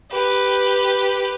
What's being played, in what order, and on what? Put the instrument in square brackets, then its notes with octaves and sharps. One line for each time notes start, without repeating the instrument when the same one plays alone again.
[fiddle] G4 B4